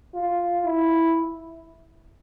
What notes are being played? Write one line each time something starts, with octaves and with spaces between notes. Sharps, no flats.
F4
E4